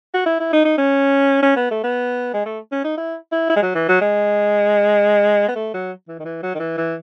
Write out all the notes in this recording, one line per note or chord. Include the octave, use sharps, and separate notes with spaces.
F#4
E4
E4
D#4
D#4
C#4
C#4
B3
A3
B3
G#3
A3
C#4
D#4
E4
E4
E4
G#3
F#3
E3
F#3
G#3
B3
A3
F#3
E3
D#3
E3
F#3
D#3
E3
E3